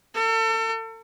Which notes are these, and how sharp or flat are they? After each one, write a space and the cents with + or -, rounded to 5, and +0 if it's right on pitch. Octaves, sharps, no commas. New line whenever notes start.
A4 +35